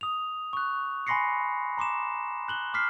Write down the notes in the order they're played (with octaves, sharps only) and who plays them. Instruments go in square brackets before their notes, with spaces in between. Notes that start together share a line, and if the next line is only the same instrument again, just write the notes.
[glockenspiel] D#6 F7
C#6 F#6
G#5 B5 C6 A#6 C7 C#7
A#5 C6 D6 E7
F#6 F#7 G7
D6 F6 B6 C7